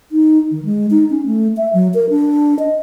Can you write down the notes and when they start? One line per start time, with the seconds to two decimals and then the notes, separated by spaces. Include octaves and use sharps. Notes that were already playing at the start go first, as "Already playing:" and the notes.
0.12 D#4
0.51 D#3
0.65 G#3
0.91 D#4
1.10 C#4
1.26 A3
1.57 E5
1.73 F#3
1.94 A#4
2.10 D4
2.59 D#5